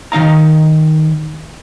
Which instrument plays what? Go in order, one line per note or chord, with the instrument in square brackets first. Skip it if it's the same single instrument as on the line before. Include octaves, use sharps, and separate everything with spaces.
[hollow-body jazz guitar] D#3 D#4 F5 A#5